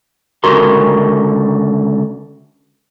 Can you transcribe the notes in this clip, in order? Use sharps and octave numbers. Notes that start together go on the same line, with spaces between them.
C#2 D3 F#4 A#4 C6